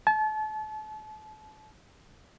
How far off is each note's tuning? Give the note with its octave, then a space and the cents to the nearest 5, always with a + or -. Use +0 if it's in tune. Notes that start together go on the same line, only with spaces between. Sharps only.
A5 -35